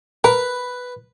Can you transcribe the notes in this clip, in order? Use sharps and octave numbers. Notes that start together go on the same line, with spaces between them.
A#4 B4